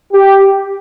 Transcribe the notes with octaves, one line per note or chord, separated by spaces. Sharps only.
G4